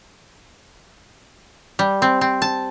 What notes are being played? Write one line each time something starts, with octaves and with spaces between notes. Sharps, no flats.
G3
C4
C4
A5